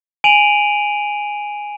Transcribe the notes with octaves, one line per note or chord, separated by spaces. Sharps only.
G#5 D7 D#7 F7 F#7